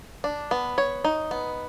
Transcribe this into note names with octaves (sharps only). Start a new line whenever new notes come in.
D4
B3
C#5
D#4
B3